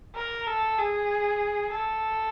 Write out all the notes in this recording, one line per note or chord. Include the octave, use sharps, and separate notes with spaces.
A#4
A4
G#4
A4